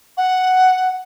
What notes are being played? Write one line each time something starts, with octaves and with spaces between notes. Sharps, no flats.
F#5